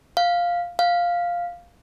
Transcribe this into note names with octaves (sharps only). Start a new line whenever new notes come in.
F5
F5